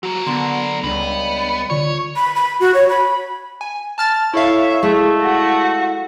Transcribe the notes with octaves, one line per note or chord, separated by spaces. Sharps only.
F#3 A#3 F#4
D3 B3 C6
C#2 G3 B3 D4
D3 F4 C#5 D5
B5
B5
F#4
C#5
B5
G#5
A5 F6 A6
E4 A4 C#5 E5 F5
G#3 A3
F#4